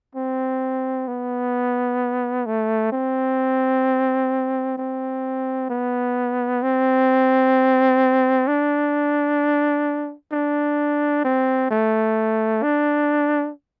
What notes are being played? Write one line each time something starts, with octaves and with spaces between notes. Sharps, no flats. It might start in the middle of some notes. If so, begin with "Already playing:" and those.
C4
B3
A3
C4
C4
B3
C4
D4
D4
C4
A3
D4